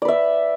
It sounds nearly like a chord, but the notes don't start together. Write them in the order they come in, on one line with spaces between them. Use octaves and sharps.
D5 B4 E5